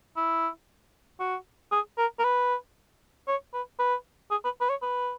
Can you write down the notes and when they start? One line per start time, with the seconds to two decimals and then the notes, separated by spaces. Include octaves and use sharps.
0.17 E4
1.20 F#4
1.72 G#4
1.98 A#4
2.19 A#4
2.24 B4
3.28 C#5
3.54 B4
3.79 B4
4.31 G#4
4.44 B4
4.61 B4
4.70 C#5
4.82 B4